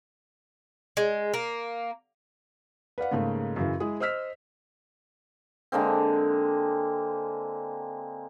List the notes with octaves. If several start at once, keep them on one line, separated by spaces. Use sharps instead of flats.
G#3
A#3
B4 D5 F5 F#5
G#2 C#3 A3 A#3
F#2 C#3 E3
G#3 E4 G#4
C5 D#5 E6 F6 B6
D3 G#3 A#3 C4